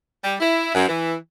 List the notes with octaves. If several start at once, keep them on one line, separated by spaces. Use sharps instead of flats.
G3
E4
F#2
E3